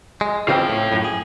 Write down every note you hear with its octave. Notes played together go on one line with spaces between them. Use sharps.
G#3
C#3 E3 C4 F4 G5
A2
F#2 A2
G#4